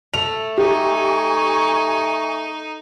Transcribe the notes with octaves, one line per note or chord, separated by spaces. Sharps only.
A3 F7
D#4 G4 G#5 C#6